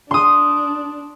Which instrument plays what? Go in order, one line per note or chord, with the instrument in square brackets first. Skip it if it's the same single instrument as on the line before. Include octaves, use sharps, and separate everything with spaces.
[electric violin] D4 [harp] C6 D#6